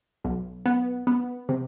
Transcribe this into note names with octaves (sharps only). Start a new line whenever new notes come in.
B1
B3
B3
C3